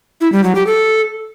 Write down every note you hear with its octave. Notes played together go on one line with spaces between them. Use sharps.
E4
G3
F#3
G4
A4